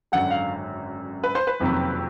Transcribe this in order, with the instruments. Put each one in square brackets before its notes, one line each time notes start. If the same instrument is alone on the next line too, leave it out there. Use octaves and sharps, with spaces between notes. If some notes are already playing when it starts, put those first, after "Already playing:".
[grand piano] G#1 F#2 D3 F#5
F5
B4
C5
B4
F#1 F2 C3 D#3 F#3